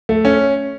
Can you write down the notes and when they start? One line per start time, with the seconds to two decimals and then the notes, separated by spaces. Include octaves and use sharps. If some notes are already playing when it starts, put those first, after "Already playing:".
0.09 A3
0.25 C#4